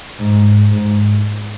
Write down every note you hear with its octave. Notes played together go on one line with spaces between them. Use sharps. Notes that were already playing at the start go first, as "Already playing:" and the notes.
G#2
G#2